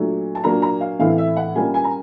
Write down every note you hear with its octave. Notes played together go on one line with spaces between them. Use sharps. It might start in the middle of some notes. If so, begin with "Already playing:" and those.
Already playing: A#2 F#3 A3 D4
A5
A#2 F#3 A#3 D4 A#5
A#5
F5
A2 E3 A3 C4 F5
E5
F#5
A#2 G3 A#3 C#4 G#5
G#5
A#5